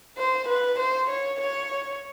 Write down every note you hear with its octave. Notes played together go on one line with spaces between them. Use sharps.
C5
B4
C5
C#5
C#5